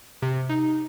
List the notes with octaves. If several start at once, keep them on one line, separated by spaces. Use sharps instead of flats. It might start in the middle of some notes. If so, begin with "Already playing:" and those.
C3
D#4